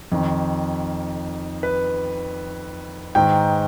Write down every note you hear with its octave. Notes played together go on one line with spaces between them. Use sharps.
F2 D#3
B4
G#2 D#3 G5